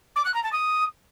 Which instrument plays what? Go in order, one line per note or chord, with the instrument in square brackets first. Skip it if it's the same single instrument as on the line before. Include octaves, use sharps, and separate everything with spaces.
[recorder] D6
F#6
A#5
A5
D#6